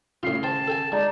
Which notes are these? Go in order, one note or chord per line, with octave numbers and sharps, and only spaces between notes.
A2 C#3 F4 C7
C5 G5 A5
A4 G5 G#5
G#3 D#4 D5 A5